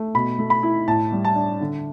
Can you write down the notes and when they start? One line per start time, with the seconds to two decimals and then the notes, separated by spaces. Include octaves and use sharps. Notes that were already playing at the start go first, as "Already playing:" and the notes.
Already playing: A3
0.15 B2 B5
0.39 A3
0.50 B5
0.63 E4
0.88 A2 A5
1.12 G3
1.25 A5
1.36 D4
1.61 D3